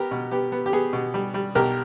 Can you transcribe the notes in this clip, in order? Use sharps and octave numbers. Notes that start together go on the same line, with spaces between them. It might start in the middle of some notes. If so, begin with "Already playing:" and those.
Already playing: B3 G4 A#4
B2
B3 G4
B3
G4
B3 G#4
B2
G3
G3
B1 G4 A#4